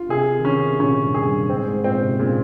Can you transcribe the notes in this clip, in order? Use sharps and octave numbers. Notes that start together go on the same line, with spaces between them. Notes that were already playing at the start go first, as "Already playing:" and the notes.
Already playing: F4
C3 G#4
D#3
C#4
C#3
C3
A#2 C#4
G2
G#4
G2
G#2 C4
G#2
A#2 C4
C3
A#2 C#3